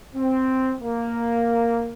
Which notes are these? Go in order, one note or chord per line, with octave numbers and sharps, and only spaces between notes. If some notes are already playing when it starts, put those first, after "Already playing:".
C4
A#3